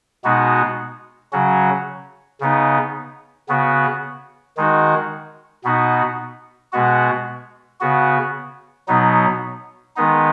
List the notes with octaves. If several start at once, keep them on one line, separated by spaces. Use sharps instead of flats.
B2 G#3 B3 D#4 F#4
C#3 F#3 C#4 F#4
C#3 B3 D#4
C#3 B3 F#4
D#3 G#3 D#4 F#4
B2 B3 D#4 F#4
B2 G#3 B3 F#4
C#3 B3 F#4
B2 F#3 B3 D#4
D#3 G#3 B3 D#4